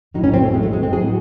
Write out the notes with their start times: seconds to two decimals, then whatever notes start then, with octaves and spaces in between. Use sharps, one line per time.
0.14 A2 F#3 D#4
0.24 C#4
0.34 C4
0.44 A3
0.54 G#3
0.63 A3
0.73 G#3
0.83 C4
0.92 A2 F#3 G#4